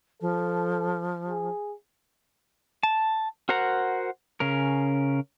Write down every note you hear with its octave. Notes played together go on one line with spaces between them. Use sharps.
F3 A4
G#4
A5
F#4 A#4 C5 F#5 A#5
C#3 C#4 A#4